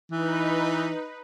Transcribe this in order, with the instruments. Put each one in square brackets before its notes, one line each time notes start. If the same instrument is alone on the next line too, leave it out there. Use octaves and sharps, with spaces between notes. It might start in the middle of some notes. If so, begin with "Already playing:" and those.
[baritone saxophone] E3 [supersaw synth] D#4 B4